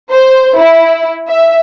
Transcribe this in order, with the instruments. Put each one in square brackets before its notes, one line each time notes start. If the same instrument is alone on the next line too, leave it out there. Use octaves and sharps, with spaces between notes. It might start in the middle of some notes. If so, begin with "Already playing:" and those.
[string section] C5
E4
E5